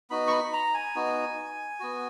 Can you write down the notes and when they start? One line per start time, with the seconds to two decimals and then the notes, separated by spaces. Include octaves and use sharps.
0.10 B3 D#4 F#4 B5
0.28 C#6
0.32 B5
0.53 A#5
0.74 G#5
0.95 B3 D#4 F#4
1.80 B3 F#4